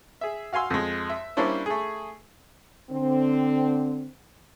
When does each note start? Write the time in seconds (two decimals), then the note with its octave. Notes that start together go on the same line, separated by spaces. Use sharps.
0.21 G#4 E5
0.53 F#4 F5 G#5 C6 E6
0.70 F2 G#3
1.10 E5
1.37 G3 A#3 C#4 D4 E4 C5
1.66 A3 G#4
2.91 D3 C4